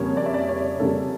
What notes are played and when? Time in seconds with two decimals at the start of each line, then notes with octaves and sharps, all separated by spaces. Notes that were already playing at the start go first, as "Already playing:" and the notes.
Already playing: F2 C#3 G3 A#3 C#5
0.17 D5
0.26 E5
0.34 D5
0.49 C#5
0.80 F2 C#3 G3 A#3 A4